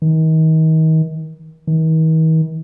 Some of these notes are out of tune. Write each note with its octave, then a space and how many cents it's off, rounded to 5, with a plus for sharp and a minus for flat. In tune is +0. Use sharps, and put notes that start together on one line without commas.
D#3 +35
D#3 +45